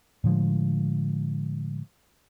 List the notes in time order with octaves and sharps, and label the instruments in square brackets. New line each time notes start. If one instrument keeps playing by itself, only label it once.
[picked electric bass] A2 D3 F3 G#3